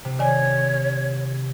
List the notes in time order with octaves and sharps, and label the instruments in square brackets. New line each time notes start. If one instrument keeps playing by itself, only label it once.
[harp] C3
[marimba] D#3 D5 G#5 [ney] C#5